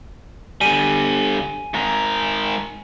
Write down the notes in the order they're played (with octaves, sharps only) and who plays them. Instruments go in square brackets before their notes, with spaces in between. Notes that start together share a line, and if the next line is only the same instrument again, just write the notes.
[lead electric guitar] D3 G3 [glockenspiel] G#5 D#7
[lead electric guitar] G#2 A#4